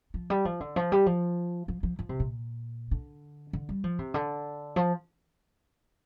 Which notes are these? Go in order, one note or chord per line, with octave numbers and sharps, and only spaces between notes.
F3
G3
F3
D3
F3
G3
F3
F3
F3
F3
C3
A#2
D3
D3
G3
F3
C3
D3
F3